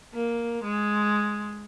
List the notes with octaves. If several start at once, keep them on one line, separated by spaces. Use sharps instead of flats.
A#3
G#3